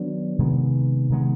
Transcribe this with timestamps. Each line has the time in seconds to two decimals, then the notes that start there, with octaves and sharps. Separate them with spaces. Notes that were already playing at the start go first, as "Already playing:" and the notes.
Already playing: D#3 F#3 B3 D4
0.39 C3 D#3 G#3 B3
1.10 C3 D#3 G#3 B3